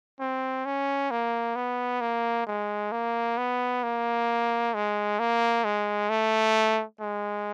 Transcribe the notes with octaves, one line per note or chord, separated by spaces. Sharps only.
C4
C#4
A#3
B3
A#3
G#3
A#3
B3
A#3
G#3
A#3
G#3
A3
G#3